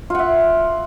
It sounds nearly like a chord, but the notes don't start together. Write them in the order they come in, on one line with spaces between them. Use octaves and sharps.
F4 F#5 E5